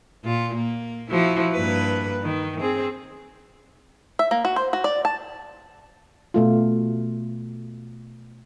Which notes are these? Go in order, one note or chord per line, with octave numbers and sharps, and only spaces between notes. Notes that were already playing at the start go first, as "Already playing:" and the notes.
A#2 F4
A#3
F3 E4 F#4
G2 A#3 B4
D#3
C4 G#4
E5
A#3
F#4
C5
F#4
D5
A5
B2 A3 F4